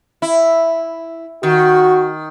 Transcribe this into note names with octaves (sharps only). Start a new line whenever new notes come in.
E4
D#3 F#4